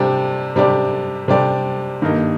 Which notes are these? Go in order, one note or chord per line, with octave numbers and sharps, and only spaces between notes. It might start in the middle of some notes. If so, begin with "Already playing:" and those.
Already playing: C3 G3 D4 G4 D5
C3 G3 D4 G4 D5
C3 G3 D4 G4 D5
G2 D#3 A#3 D#4